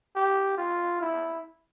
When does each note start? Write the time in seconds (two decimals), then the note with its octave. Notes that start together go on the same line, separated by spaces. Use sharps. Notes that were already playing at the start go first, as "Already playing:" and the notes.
0.15 G4
0.58 F4
1.01 E4